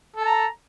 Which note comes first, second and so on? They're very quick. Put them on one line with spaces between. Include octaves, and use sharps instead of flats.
A4 A5 A#5